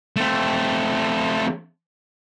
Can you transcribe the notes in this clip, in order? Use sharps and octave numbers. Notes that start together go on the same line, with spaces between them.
A3 C4